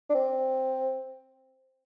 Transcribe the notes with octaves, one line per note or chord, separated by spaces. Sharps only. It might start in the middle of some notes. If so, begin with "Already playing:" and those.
D4
C4